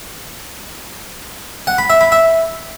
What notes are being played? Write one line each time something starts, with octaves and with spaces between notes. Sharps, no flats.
F#5
B5
E5
B5
E5